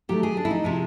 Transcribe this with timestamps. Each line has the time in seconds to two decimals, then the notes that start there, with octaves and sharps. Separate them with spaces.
0.09 D#3 F#3 A3 G4
0.23 G#4
0.37 D4
0.45 E4
0.51 D#4
0.64 C3 F3 G#3 E4